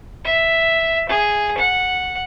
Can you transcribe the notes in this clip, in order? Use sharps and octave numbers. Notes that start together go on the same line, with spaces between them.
E5
G#4
F#5